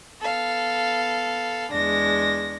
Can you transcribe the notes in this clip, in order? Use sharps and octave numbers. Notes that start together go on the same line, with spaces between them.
B3 A4 F5
E2 G#3 D4 A#6